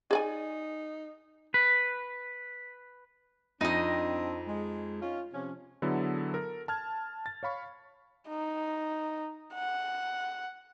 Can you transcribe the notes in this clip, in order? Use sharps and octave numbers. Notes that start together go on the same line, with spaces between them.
D#4 G#4 D5 G#5
B4
F2 C4 D4 D#4 D#5
G#3
C#4 F4
C3 F3 C#4
D3 F#3 B3 E4 G#4 A4
A4 A#4
A5 F6 G#6
A6
C#5 F5 B5 C#6
D#4
F#5